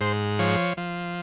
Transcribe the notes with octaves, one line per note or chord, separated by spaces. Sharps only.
G#2 C5
F3 C#5
F3